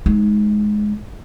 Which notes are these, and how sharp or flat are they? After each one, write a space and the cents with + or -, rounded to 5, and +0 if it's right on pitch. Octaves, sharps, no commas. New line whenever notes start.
G#3 +15 D#4 +15